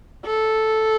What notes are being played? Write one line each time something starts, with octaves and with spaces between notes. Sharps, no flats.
A4